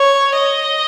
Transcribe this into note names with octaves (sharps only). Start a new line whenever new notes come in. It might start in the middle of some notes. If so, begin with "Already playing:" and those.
Already playing: C#5
D#5